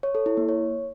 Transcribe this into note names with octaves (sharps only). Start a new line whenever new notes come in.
C#5
A4
E4
A#3
C#5